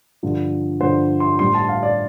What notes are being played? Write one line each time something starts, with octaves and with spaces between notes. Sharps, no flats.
G2 D3 F3
G2 D3 F3 C5
C6
A2 G3 C4 C6
A5
F5
D5